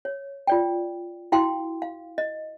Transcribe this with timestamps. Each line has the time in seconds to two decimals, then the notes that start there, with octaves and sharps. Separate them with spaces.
0.05 C#5
0.47 F4 D5 G5
1.32 E4 F#4 F5 G5 C6
1.82 F5
2.18 D#5